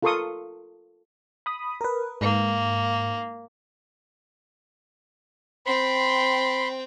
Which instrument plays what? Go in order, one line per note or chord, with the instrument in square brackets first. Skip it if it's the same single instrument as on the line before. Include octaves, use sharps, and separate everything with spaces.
[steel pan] F4 A4 A#4 C6 C#6 D#6
[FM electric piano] B5 D#6
A#4 B4
[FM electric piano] G#2 [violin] A#3
[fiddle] C4 G5 [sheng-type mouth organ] B5 C6